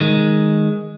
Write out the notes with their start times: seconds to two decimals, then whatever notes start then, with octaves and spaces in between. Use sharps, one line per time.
0.01 D#3 G#3